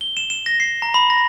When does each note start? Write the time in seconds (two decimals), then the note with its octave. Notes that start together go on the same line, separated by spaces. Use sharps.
0.01 G7
0.17 E7
0.30 E7
0.46 A#6
0.60 C7
0.82 A#5
0.94 B5
1.10 A#6